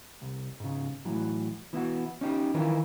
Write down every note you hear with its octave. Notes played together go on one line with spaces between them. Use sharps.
C2
G#2 C#3
A2 E3 F#3
E3 B3 E4 F#4
C#4 D#4 F#4 G4
D#3 E3 E4 F4 A#4 B4